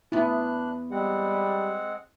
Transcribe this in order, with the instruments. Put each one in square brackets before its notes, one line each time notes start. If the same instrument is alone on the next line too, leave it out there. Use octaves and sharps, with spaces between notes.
[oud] E2 B3 [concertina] D4 F#6 [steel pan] E4 C6
[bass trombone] G3 [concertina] G#3 C4 F#5